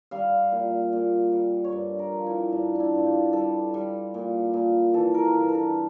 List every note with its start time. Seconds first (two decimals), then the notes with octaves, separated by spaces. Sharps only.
0.11 G3 F5
0.52 A#2
0.93 A#2
1.33 G3
1.64 C#5
1.72 G2 D5
1.99 A#4
2.12 F3
2.27 E4
2.52 G2 D4
2.75 D4 E4
2.93 G2 F4
3.06 G4
3.33 G3 A4
3.74 G3
4.14 A#2
4.54 A#2
4.94 E3 A4
5.14 A#4
5.25 A#4
5.34 G2 A4
5.48 A#4
5.55 A4